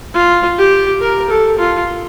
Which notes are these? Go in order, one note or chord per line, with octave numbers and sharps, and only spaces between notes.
F4
G4
A#4
A4
F4